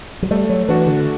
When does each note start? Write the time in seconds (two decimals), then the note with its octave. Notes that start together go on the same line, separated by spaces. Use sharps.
0.22 F#3
0.31 G3 A3
0.49 F#3
0.68 E3 D4 F#4
0.87 D3